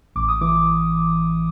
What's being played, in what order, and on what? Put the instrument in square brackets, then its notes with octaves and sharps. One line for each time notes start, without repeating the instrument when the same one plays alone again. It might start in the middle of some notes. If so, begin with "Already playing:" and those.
[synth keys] A1 D6
D#6
E3 D6
D6